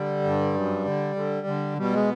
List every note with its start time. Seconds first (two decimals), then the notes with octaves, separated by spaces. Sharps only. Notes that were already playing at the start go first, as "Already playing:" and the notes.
Already playing: D3 G3
0.24 G2
0.54 F#2
0.85 D3
1.16 D3
1.47 D3
1.78 B2 G3
1.94 G#3